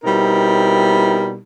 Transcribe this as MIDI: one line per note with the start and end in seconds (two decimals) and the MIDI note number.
0.04 1.37 47
0.04 1.37 55
0.04 1.37 60
0.04 1.37 63
0.04 1.37 64
0.04 1.37 70